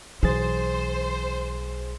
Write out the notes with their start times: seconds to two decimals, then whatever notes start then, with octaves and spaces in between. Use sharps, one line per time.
0.23 B1 E3 G#4 C5 A6